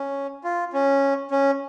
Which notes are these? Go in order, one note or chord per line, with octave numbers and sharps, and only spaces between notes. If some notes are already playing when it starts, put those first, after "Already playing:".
Already playing: C#4
F4
C#4
C#4